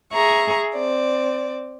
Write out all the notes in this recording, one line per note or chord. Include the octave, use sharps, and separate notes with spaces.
G#4 E5 A#5 C#6
C4 D5